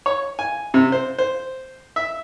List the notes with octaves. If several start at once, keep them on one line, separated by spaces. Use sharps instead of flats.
C#5
G#5
C3
C5
C5
E5